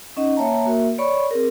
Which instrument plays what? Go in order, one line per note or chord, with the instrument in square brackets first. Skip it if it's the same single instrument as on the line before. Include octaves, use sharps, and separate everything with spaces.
[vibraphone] C#4 D#4 D#5 F#5
A#3 C#5 E5 G5 A5 A#5
A#3 F#4 A#4 E5
C#5 D5 B5 C#6
C4 G#4 A#4